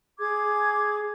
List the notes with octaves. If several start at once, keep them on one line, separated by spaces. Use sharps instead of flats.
G#4 D6 G#6